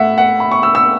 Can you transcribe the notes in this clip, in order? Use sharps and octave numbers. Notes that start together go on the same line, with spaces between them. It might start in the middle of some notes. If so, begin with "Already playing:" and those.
Already playing: A2 A3 E5 F#5
F#5
B5
C#6
E6
E6